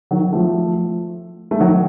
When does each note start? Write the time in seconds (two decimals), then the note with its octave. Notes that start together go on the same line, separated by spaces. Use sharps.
0.11 D#3 F#3
0.33 F3 A3
1.51 A3
1.60 D#3 F#3